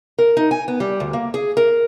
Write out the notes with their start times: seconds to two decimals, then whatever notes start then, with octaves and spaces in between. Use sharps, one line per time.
0.18 A#4
0.37 D#4
0.51 G#5
0.68 B3
0.80 G3
1.00 D2
1.13 A#3
1.34 G#4
1.57 A#4